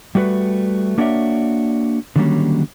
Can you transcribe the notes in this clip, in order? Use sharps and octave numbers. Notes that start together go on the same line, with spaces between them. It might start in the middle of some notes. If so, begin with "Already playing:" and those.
G3 A3 F#4 B4
A#3 D4 F#4 C#5 D5 E5
D3 D#3 F#3 G3 A#3 C#4